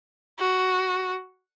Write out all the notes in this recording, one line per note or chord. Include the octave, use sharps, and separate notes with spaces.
F#4